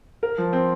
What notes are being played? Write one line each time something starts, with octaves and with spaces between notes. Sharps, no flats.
A#4
F3
C4